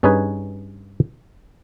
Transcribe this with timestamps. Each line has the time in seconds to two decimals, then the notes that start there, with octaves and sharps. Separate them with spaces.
0.03 G2 C#4 D#4 G#4 B4 G#5